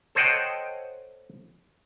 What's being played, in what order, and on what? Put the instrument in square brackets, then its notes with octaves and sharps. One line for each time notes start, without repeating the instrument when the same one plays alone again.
[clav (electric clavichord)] A4 C5 C#5 D#5 F#5 G5